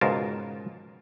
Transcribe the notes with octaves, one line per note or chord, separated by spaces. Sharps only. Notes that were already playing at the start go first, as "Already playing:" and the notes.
C#2 G#2 B2 F4 A#4 A5